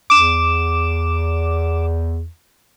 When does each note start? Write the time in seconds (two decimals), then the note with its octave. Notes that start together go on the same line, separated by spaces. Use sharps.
0.10 E2 D6 E7